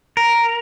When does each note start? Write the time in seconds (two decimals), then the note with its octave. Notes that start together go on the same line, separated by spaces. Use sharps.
0.17 A#4